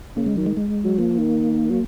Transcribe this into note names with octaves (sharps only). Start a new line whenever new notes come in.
C#3 A#3
G#3
D#3 F#3
G#3
G#3
F#3
F3 A#3
D#3
F#3